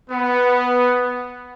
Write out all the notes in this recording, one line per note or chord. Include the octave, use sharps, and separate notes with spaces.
B3